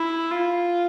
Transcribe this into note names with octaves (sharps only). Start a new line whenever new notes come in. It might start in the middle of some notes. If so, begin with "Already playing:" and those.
Already playing: E4
F4